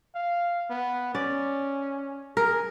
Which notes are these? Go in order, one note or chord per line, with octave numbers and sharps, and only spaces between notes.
F5
B3
C#4 D5
G#4 A#4